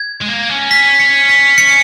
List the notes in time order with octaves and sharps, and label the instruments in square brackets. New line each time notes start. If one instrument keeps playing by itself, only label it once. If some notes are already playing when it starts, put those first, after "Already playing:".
Already playing: [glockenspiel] G#6
[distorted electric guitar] G#3
A#3
C#4
[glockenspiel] B6
C#7
B6
C#7